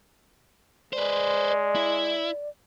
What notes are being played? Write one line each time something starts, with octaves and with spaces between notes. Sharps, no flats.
G#3 B4 C5 D5
E4